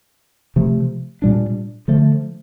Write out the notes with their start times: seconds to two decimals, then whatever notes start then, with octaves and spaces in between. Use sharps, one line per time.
0.56 C3 F3 A3
1.22 A#2 G3 D4
1.88 D3 F3 A3